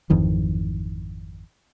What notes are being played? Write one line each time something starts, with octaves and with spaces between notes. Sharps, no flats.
G#1 F2 D#3 E3